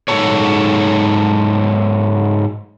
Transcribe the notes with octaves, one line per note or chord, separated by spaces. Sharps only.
G#2 E3 F#3 A4 C#5